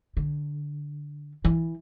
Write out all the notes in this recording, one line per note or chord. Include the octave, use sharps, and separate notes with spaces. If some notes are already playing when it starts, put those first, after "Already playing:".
D3
E3